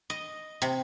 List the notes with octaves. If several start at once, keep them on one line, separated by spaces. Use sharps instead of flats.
D#5
C3